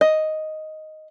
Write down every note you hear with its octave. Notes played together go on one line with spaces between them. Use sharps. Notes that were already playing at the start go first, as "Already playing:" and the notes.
D#5